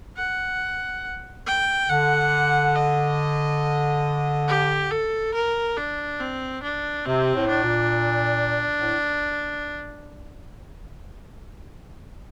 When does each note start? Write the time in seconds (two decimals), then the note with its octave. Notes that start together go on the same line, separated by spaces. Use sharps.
0.17 F#5
1.47 G5
1.90 D3 F#5
2.76 D#5
4.48 G4
4.91 A4
5.34 A#4
5.77 D4
6.20 C4
6.63 D4
7.06 C3 C4
7.35 A2
7.49 D4
7.64 A#2
8.79 A2